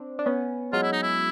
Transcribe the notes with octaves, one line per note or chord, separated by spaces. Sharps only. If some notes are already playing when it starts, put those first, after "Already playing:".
Already playing: C4 D4
D4
B3 C#4
F#3 G#3 F4
E4
D#4
E4